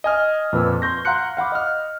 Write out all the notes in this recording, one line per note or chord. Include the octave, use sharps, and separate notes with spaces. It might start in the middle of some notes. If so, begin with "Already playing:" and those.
D#5 G#5 F6
F2 A#2 B4 E6
C6 C#6 G6 A#6
F5 F#5 A#5 C6 F#6 C#7
F5 F#5 B5 D6
D#5 F6